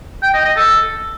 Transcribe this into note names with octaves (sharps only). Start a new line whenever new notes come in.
G5
D#5
D#5
A4